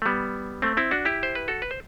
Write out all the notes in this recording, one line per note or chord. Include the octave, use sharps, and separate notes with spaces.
A3
G3 B3
A3 C4
C4 E4
D4 F#4
E4 G4
C5
B4
F#4 A4
B4
C5